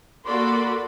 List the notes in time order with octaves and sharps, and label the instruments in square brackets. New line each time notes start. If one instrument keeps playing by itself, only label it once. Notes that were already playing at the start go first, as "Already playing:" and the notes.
[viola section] A#3 F#4 A4 D5 B5 C6